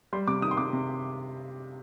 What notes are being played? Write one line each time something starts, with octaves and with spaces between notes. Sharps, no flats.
G3 C6
C3 D6
D#3 D#6
C6
C3 D6
C3